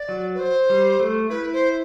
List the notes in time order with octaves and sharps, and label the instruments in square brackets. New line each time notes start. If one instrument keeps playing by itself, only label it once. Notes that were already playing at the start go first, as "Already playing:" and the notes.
Already playing: [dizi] D5
[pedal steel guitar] F#3
[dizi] B4
C5
[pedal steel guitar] G3
A3
[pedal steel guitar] E4 [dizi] B4
[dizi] C5